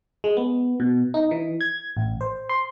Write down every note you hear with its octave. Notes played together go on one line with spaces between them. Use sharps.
G#3
B3
B2
D#4
E3
G#6
A1
C5
C6